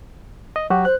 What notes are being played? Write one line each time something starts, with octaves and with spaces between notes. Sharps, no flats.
D#5
F#3 F#4 G4
C5 F#6